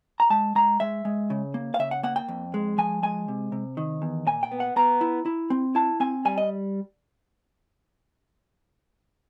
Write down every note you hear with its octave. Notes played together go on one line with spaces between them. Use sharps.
A#5
G#3 A5
G#3 A#5
G#3 E5
G#3
C#3
A#3
F5
C#3 E5
F#5
A#3 F#5
G5
F2
G#3
F3 G#5
G#3 G#5
C3
C3
D#3
E2
A#2 G#5
G5
B3
F#5
B3 A#5
E4
E4
C4
E4 A5
C4 G#5
G3 G#5
D#5